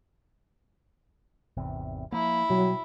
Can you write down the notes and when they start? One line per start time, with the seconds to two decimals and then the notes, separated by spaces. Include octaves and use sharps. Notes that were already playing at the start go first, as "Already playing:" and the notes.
1.57 G#1 E2 C3
2.12 F3 A#3 E4
2.50 B2 F#3 G3